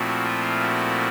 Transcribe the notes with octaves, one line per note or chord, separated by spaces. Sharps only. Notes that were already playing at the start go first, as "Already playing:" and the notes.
Already playing: A#2 F3 A3 C4 E4 F#4
F4
F#4